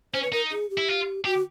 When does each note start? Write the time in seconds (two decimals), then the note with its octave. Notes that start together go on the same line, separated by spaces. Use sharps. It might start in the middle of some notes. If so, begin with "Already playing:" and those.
0.14 C#4 C5
0.23 B4
0.32 D#4 A#4
0.52 G#4
0.70 G4
0.78 E4
0.88 F4
1.25 F#4 G4